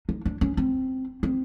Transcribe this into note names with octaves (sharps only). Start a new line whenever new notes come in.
D#4
D4
C#4
C4
C4